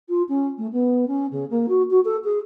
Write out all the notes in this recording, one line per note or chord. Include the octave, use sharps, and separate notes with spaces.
F4
C#4
A3
B3
C#4
C#3
A#3
F#4
F#4
A4
G#4